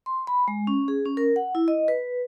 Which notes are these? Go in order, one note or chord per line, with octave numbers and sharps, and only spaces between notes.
C6
B5
G#3
C#4
G#4
C#4
A#4
F#5
E4
D#5
B4